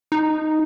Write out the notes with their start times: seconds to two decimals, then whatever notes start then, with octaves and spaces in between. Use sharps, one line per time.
0.12 D#4